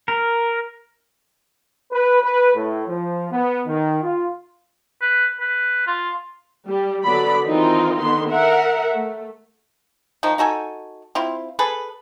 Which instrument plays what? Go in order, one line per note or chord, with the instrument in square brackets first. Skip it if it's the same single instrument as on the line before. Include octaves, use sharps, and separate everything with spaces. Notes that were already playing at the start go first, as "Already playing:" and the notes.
[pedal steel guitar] A#4
[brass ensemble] B4
B4
A2
F3
B3
D#3
F4
[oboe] B4
B4
F4
[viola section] G3
D3 F#3 B3 D5 B5
D#3 E3 C4 D#4 F4
D3 D#3 B3 C6
A#4 E5 F#5
A3
[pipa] D#3 F3 D#4
D#4 F#4 A4 G#5
C4 E4 F4
G#4 A4 B4